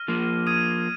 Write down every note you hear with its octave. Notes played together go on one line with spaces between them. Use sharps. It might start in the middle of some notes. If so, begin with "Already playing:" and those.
Already playing: F6 A#6 D#7
F3 A#3
D#6 G#6 D#7